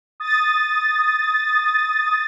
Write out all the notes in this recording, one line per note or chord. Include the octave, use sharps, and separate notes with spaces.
D#6 A6